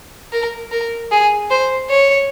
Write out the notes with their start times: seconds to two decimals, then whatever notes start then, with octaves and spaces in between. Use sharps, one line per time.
0.32 A#4
0.71 A#4
1.11 G#4
1.50 C5
1.90 C#5